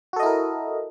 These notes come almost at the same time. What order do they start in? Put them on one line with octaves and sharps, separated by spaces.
F#4 A4 D#5 E4 A#4